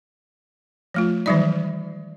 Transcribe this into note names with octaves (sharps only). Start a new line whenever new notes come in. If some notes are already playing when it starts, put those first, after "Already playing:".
F3 A3 F4
D#3 E3 F#3 G3 D#4 D5